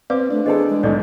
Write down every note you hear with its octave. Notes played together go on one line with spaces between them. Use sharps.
C4 B4 D5 F5 D6
A3 D4
E3 C4 G#4 A4 D#5
G#3
B1 G#2 D3 A4 D5 D#5